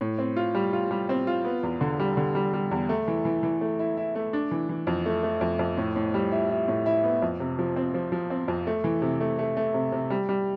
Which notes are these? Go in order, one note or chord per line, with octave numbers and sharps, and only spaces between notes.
A2
C4
F4
G3
F4
G3
C4
F4
B3
E2
D3
G3
D3
G3
G3
E2
A3
E3
E3
E3
A3
E4
E4
A3
D4
E3
E3
F2
A3
A3
F2
F2
A2
A2
G3
E4
E4
A2
E4
B3
F2
C3
F3
C4
F3
F3
C4
F2
A3
E3
C3
A3
A3
A3
C3
C3
G3
G3